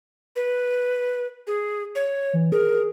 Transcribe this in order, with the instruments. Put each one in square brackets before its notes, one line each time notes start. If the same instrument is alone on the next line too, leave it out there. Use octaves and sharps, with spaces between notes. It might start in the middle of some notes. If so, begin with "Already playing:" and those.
[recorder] B4
G#4
C#5
[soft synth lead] E3
[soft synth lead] G#4 [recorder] A#4